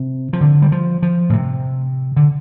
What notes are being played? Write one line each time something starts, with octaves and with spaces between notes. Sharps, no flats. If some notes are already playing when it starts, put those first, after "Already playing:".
Already playing: C3
F3
D3
G3
F3
F3
A2
C3
D3